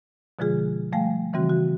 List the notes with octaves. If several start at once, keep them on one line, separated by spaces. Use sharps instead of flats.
B2 D3 F3 G#3 F4 G#4
F3 G3 A3 F5 G5 G#5
C#3 E3 G3 C4 F#4
F#4